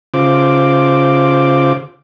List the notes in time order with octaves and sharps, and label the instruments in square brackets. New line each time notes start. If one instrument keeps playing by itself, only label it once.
[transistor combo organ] C#3 F4 C5 D6